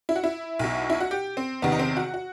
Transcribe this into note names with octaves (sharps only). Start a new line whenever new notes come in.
E4
F#4
E4
B1 B2
E4
F#4
G4
C4
E2 C3 D#3 B3
D#4
C4
F#4
F#4